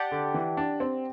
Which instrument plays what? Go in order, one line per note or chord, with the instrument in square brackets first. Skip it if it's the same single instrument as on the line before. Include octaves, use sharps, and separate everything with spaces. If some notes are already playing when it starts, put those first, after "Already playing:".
Already playing: [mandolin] G4 D5 F#5 A5
[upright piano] D3
E3
D4
C4